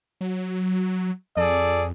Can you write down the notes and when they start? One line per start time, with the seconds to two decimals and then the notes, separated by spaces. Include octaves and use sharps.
0.21 F#3
1.37 F2 G#4 A4 D5